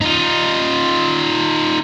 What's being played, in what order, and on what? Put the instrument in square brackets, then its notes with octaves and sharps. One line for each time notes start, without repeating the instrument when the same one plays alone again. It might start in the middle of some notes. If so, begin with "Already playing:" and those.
[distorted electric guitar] D#4 F4